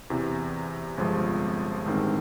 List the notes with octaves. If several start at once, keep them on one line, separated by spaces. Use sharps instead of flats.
E2 C3 E3
G1 F2 C3 F3 G#3
A1 G2 D#3 G#3 C4